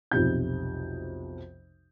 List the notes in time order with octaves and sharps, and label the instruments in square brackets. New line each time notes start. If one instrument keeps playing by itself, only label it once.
[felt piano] B1 F2 C3 G6